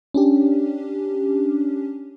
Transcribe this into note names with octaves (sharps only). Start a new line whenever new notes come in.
C#4 D4 G4